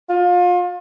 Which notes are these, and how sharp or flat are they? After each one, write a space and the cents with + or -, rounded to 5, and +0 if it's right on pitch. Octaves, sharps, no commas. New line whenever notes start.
F4 +30